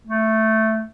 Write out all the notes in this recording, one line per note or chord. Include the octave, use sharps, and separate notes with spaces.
A3